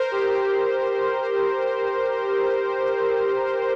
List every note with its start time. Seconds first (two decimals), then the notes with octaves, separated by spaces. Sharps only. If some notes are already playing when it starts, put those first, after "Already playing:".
Already playing: A#4 C5
0.12 G4
0.30 G4